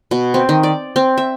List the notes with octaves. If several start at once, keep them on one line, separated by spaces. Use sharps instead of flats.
B2
C4
D#3
D5
C4
E5